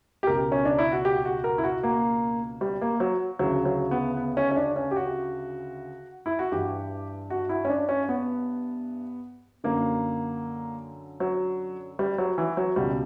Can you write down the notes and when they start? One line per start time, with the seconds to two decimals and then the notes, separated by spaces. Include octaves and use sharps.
0.23 G4
0.27 C#2 B2 A#4
0.52 C#4
0.65 D4
0.79 E4
0.92 F#4
1.05 G4
1.25 F#4
1.44 A#4
1.58 E4
1.64 F#4
1.83 A#3
2.61 G3
2.81 A#3
3.00 F#3
3.39 D2 C#3 E3 F#3
3.65 F#3
3.91 B3
4.17 B3
4.37 C#4
4.51 C#4
4.56 D4
4.76 C#4
4.91 G4
4.96 F#4
6.26 E4
6.39 F#4
6.52 G2 E3 G4
7.30 F#4
7.49 E4
7.65 C#4
7.69 D4
7.89 C#4
8.09 B3
9.64 F#2 D3 A#3
11.20 F#3
11.99 G3
12.18 F#3
12.38 E3
12.57 F#3
12.76 C#2 B2 G3